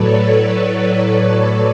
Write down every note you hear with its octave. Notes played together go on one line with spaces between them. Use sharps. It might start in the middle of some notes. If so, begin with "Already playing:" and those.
Already playing: A2 F#3 A4 B4 C#5 D5
B4 D5
A4 C#5
B4 D5